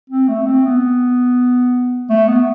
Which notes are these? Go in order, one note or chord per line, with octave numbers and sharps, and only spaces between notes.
C4
A3
C4
B3
A3
B3